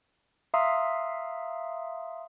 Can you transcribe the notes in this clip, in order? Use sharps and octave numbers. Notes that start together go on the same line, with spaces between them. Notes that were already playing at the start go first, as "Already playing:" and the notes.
E5 F5 A#5 C6 D#6